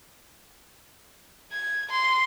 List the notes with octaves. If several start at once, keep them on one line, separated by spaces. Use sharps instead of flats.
G#6
C6